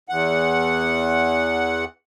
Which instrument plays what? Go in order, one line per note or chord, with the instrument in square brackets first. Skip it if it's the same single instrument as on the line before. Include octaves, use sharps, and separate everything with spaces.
[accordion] E2 F#5